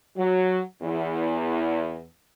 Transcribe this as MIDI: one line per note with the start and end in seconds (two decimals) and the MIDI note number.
0.17 0.60 54
0.82 2.04 40